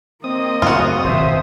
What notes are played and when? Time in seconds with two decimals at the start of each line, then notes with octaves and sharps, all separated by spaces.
0.24 A#3 C4 D#5 D#6
0.62 F#2 C#3 A3 F4 F#4
1.04 D#1 G#1 B2 C5 E5